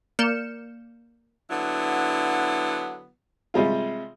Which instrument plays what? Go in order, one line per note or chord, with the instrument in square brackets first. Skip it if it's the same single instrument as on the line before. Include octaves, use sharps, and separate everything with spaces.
[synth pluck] A#3 D5 F6 G6 C#7 E7
[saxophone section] D3 F#3 B3 E4
[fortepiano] C3 G3 G#3 F4